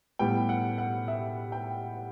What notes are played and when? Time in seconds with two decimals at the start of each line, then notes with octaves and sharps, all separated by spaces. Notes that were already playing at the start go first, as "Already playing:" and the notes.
0.19 A2 G3 B3 G5
0.49 F#5
0.78 F#5
1.08 E5
1.52 G5